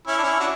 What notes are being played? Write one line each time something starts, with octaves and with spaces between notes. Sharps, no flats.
C#4 E4
D4
C#4 E4
D4 F#4